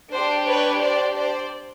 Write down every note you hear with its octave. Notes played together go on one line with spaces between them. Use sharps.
D4 G4 C5
B4 C#5
C5 D5
C5 D5